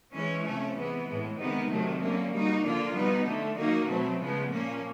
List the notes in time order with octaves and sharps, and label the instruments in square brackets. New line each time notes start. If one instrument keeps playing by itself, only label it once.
[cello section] E3 G#3 C#4
C3 F3 A3 C#4
E3 G#3 B3
A2 E3 G#3
C3 D#3 G#3 B3 D#4
C3 D#3 F#3 A3
D3 F#3 A#3 C#4
G3 A#3 D#4 F#4
D3 F3 A#3 D4 F4
B2 G3 B3 D#4
D3 F3 A3
D#3 F#3 A#3 D#4 F#4
B2 F#3 A3 C4
C#3 F3 G#3 B3
A#2 F3 A#3 C#4